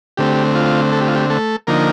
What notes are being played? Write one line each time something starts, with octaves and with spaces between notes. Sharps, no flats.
D3 A3 C4 G4
F4
A4
G4
F4
G4
A3 A4
D3 F3 A#3 D#4 A#4